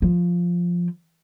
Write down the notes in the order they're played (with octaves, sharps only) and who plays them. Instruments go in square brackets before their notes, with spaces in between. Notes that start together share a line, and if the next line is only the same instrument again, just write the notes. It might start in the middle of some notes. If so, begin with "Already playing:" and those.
[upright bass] F3